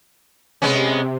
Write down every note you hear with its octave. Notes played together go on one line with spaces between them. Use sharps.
C3 G#3 B3 C#4